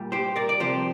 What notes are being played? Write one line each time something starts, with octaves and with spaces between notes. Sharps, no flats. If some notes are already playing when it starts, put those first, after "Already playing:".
Already playing: A#2 G3
G4 C5
A#4 D5
D5
C3 F3 G4 C5